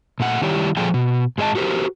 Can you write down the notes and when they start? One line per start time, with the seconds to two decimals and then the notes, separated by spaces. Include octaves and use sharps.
0.20 A#2 A3 F#5
0.42 D#3 G3 E4 G4 C#5 D5
0.77 A#2 F3 G#4 A4 D5 G5
0.94 B2
1.38 G#2 G#4 D#5 A5
1.55 F#4 G4 A#4 C5